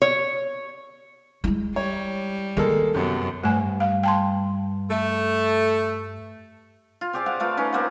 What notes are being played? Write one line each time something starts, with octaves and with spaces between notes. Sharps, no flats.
C#5
G#3 E4
G3 C#5
D#3 G#3 A#3 A4
F#2 C3 B3
G2 A3 G#5
F5
G5 A5 C6
A3
F4
C4 G4 G#4 D5
F5 F#5 A5
A3 F4 B4
C#4 D#4 B4
A#3 C4 C5 F#5